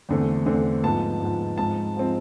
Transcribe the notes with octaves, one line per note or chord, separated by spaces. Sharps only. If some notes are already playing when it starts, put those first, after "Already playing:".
E2 D3 A3 C4
E2 D3 A3 C4
G#2 F3 B3 A5
G#2 F3 B3
G#2 F3 G#3 C4 A5
F3 G#3 C4